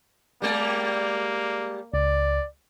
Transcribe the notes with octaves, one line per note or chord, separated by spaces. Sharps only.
G3 G#3 A#3 D5
C#2 D5